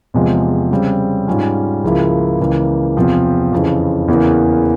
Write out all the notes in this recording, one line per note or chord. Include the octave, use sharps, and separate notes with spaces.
E2 C3 F3 G#3
C#3 G3 C4
G#2 G3 C#4 F4
C#2 C#3 F3 A#3 E4
C#2 C#3 E3 A#3
E2 C3 F3 C4
F2 C#3 E3
E2 C#3 E3 A#3